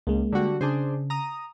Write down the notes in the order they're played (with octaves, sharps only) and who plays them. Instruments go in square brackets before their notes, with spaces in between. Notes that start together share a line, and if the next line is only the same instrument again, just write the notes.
[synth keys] C#2 [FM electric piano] G#3 A#3
[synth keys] D3 G3 F#4
[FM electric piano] C#3 [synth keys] D4 G#4 C5
[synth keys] A#5 D#6